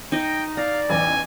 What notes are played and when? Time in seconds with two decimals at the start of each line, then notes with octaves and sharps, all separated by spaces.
0.12 D#4 D#5 G5
0.57 D5 F5 A#5
0.90 A1 E2 G#5